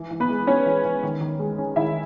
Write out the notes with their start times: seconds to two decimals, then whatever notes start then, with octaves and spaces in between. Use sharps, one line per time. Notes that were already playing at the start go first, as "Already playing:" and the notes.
Already playing: E3
0.11 E3
0.20 B3 B4
0.30 G#3
0.47 B3 C#4 C#5
0.66 E3
0.85 E3
1.03 D#3
1.21 D#3
1.39 G#3
1.58 C#4
1.76 D#3 E4 E5